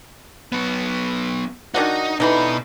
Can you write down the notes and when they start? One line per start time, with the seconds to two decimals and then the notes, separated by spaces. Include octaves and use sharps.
0.52 F#3 B3
1.74 D#3 D4 D#4 F#4
2.20 B2 D3 E3 D#4 B5